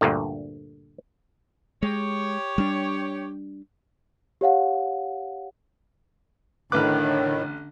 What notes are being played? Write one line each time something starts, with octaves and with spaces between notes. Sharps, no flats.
D2 G2 A#2 D3
G#3 G4 C#5
G3 D4
G4 C#5 F5 F#5
A1 A2 D3 D#3 B4 D6 F6 F#6